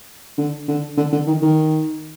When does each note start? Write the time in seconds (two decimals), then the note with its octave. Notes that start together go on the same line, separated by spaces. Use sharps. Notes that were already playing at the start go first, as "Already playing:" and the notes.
0.38 D3
0.68 D3
0.97 D3
1.12 D3
1.27 D#3
1.42 D#3